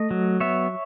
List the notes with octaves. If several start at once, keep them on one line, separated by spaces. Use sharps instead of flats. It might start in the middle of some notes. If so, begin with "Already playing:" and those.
Already playing: A3 D#5
F#3
B3 C#5 E5